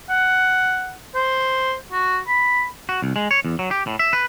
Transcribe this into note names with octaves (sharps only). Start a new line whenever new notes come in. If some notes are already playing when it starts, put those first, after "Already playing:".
F#5
C5
F#4
B5
F#4
C2
G#3
C#5
E2
F#3
G4
A2
E5
B4